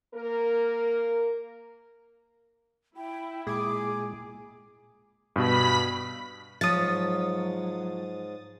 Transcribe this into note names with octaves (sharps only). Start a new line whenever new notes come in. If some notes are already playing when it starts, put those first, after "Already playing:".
A#3 A#4
E4 G5
A#2 G#3 G#4 D6
G2 B2 B5 B6
G#2 F3 F#3 C#5 D#6 A6